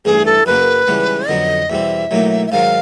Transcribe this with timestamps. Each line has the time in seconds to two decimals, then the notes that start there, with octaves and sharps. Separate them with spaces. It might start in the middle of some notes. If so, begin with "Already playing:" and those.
0.05 A1 G2 E3 A3 G#4
0.26 A4
0.46 F#2 C#3 F#3 A#3 B4
0.88 C#2 C#3 E3 G3 B3
1.28 F2 D3 F#3 B3 D#5
1.70 E2 B2 G3 C4 E5
2.11 B1 A2 F#3 A#3 D#4
2.47 E5
2.52 G#2 D#3 F#3 F5